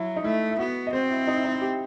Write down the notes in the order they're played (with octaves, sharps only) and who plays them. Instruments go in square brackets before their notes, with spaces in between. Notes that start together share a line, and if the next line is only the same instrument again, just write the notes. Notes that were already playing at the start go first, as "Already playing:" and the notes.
Already playing: [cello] F#3 [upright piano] E4
[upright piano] D#4
[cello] A3 [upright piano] E4
[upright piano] E4
[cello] B3 [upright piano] F#4
[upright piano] D#5
[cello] C4 [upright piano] C5
[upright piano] E4
D#4
E4
D#4
E4
G4